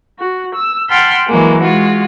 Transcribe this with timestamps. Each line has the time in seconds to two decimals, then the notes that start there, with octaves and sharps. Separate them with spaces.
0.19 F#4
0.54 E6
0.89 F#5 G5 A5 B5 C6 F6
1.28 E3 F#3 G#3 A#3
1.61 G#3 F4 F#4